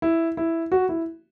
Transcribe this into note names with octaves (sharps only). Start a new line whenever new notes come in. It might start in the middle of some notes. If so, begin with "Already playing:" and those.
E4
E4
F#4
E4